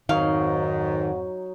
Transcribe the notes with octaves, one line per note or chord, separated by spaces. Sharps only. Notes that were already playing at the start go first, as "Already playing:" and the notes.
F2 G#2 D#3 F#3 D#4 C#5 F5